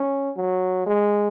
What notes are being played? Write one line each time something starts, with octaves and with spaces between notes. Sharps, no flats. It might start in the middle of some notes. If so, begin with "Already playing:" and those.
Already playing: C#4
F#3
G#3